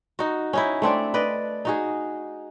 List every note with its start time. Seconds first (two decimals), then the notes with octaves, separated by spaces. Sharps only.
0.19 D#4 F#4
0.53 C#4 D#4 E4
0.82 A3 C4 D4 D5
1.14 B4 D5 D#5
1.65 D#4 F#4 G#4